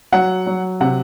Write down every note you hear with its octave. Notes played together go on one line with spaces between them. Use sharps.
F#3 F#5
F#3
C3 F#5